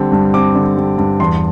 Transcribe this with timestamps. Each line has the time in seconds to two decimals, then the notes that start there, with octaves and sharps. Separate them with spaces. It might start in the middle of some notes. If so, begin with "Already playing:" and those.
Already playing: D3 G3 C4
0.12 G2
0.34 C4 D6
0.55 D3
0.77 G3
0.98 G2
1.20 E2 C6